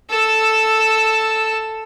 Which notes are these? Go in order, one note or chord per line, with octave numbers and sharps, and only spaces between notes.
A4 E6